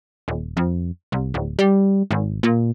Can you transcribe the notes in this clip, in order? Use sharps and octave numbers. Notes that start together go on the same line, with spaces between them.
D#1
F2
C2
D1
G3
G#1
A#2